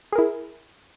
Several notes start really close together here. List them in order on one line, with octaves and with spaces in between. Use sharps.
G#4 A#4 E4